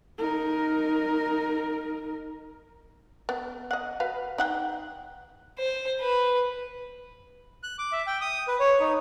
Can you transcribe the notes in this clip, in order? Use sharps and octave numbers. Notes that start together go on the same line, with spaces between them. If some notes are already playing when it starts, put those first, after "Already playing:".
D#4 A#4
B3
D#5 F#5
F#4 B4 F5
D#4 F#5 G5
C5
B4
F#6
D6
E5
G5
D#6
B4
C#5
D#4